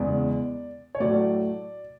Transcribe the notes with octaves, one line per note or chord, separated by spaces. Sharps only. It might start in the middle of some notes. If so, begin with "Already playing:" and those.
Already playing: E2 C#3 G#3 D5
C#5
A2 F#3 A3 D5